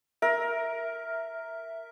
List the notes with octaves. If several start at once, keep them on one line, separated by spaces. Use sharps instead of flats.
A#4 E5